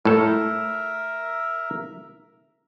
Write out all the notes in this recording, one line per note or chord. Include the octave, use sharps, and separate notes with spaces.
A2 A4 A#4 E5